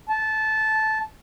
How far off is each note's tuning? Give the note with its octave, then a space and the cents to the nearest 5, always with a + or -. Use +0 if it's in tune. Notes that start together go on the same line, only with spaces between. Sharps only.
A5 -15